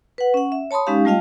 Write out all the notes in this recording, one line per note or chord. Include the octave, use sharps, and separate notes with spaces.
B4 F#5
C#4 F#5
E5
C#5 A5 B5 C6 D#6
G#3 C#4 D#4 G4 F5
G3 A3 F4 D#5 F5 G5